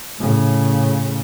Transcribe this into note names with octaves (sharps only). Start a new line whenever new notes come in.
A2 C#3